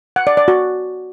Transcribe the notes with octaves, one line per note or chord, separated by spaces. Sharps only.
F#5
D5
D5
F#4